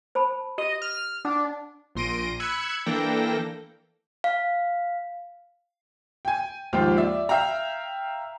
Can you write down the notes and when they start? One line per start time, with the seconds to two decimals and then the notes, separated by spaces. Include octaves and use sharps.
0.15 C5 A5 B5
0.58 G4 D#5
0.82 F6
1.25 D4 F#5
1.95 A#1 A#2 C6 A#6 D7 D#7
2.40 B5 E6 F#6 G#6 C#7
2.86 E3 A#3 D4 A4 G5 A#6
4.24 F5
6.25 G5 G#5
6.73 D#2 G#2 F3 F4 G5
6.97 D5 E5
7.29 E5 F5 G5 A#5